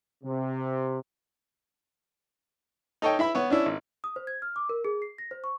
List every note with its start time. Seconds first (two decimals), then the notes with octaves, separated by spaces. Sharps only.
0.24 C3
3.02 D#4 A4 C#5 D#5 G5
3.19 E4 E5 B5
3.35 B3 C#5
3.50 C#4 D4 E4
3.66 G#1
4.04 D#6
4.16 C5
4.27 G#6
4.42 F6
4.56 D6
4.69 A#4
4.85 G#4
5.02 C7
5.18 A#6
5.31 C5
5.44 C#6